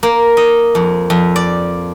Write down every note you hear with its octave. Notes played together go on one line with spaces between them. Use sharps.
A#3
D#5
F2
F2
D5